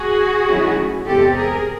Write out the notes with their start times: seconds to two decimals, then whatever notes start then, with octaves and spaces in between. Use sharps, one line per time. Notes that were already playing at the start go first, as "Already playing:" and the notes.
Already playing: F#4 G#4
0.49 D#3 F#3 A3 C#4 E4
1.07 E2 C3 E3 G#3 C4 G4 A4
1.37 G#4 A#4